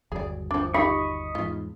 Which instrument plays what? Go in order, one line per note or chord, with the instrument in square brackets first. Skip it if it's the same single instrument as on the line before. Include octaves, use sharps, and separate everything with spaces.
[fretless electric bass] G1 D#2 F#3 [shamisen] G#4 D5
[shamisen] F3 D4
[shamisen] D#4 F4 G4 [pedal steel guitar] D#5 B5 C#6
[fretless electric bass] E2 G#2 [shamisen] F4